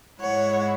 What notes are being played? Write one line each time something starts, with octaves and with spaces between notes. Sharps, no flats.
G#2 G#3 E4 C#5 F#5